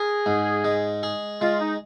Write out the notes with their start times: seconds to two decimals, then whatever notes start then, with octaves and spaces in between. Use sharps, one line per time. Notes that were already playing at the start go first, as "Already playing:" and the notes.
Already playing: G#4 A#4
0.26 G#2
0.64 G#3
1.03 G#4
1.41 G#3 F4
1.61 D#4